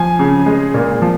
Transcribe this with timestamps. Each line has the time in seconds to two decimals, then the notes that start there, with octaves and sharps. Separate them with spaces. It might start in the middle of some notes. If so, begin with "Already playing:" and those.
Already playing: F3 G#5
0.19 C#3
0.46 G#3
0.74 A#2
1.02 F3